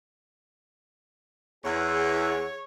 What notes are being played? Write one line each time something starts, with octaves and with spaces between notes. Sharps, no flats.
E2 G#4 C#5